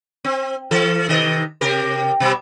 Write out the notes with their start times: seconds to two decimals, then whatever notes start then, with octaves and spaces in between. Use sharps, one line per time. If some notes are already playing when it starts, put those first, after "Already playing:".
0.24 C4
0.71 E3 A4
1.08 C3 D#3 D#5
1.61 C3 G4 A#4
2.20 B2 G3